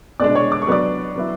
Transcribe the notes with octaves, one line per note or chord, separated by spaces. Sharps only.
B2 G#3 D4 D5 D6
C#5 C#6
D6
C#6
F#3 B3 D4 D5 D6
F#3 B3 E4